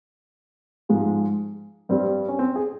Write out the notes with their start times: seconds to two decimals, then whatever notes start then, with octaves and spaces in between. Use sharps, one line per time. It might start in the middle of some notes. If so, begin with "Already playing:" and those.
0.89 G#2 F3 G#3
1.89 G2 G3 C4
2.28 C#4
2.39 C4
2.56 G#4